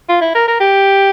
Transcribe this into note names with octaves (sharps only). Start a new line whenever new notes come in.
F4
E4
A#4
A#4
G4